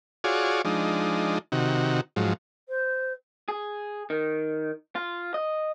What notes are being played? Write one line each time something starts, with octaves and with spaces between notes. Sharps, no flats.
F4 F#4 G#4 C#5 D5
F3 G#3 D4 D#4
C3 D#3 F#4
G#2 F3 F#3
C5
G#4
D#3
F4
D#5